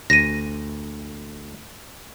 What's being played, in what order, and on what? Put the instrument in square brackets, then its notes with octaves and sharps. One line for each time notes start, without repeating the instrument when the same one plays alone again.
[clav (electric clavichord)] D2 [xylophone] A#6 D#7